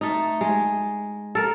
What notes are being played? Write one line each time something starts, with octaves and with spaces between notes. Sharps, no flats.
A3 D#4
G#3
A4 A#4